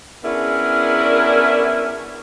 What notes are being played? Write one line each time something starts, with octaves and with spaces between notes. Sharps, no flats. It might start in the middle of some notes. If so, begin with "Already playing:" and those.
B3 C#4 D4 E4 G#4 A#4